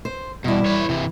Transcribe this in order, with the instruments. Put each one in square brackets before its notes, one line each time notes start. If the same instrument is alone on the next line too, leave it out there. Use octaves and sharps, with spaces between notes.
[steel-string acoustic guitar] C5
[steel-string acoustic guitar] E2 E4 [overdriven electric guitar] B2 [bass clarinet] G3
[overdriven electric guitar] B4 C#5
C3 E3